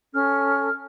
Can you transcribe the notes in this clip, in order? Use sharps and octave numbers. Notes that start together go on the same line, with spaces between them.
C#4 A4 F6